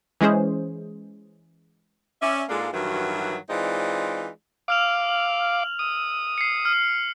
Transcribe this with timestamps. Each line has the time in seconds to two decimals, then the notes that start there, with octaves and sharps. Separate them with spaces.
0.21 E3 G#3 C#4 G#4 C5
2.22 C#4 D5 E5
2.49 G#2 G#3 A#3 D4 F4 A4
2.73 G2 D#3 E3 F#3 F#4
3.50 E3 G#3 C4 D#4 F4 D5
4.68 F5 D6 E6 F6 F7
5.09 F#7
5.79 D#6
6.38 C7 C#7
6.65 F6